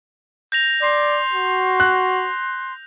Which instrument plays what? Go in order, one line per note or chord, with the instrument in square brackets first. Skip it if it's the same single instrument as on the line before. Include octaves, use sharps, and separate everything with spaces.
[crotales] G6 A#6 F7
[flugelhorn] D5 [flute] C6
[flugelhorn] F#4
[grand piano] F#6